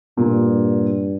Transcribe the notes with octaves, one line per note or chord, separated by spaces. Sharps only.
G2 A#2